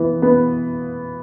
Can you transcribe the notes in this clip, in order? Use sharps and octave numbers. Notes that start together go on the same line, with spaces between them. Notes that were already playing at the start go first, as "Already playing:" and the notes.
Already playing: E3 B3
B3